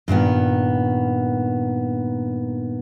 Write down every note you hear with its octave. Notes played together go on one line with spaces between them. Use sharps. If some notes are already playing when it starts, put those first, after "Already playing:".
G2 A#2 D#3 B3